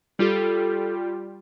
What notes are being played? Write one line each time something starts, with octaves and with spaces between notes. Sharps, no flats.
G3 F4 G4 A4